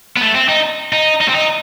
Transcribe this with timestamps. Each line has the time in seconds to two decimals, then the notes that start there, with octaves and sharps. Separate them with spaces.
0.17 B3
0.21 A3
0.35 C4
0.49 D#4
0.93 D#4
1.21 D#4
1.28 C4
1.35 D#4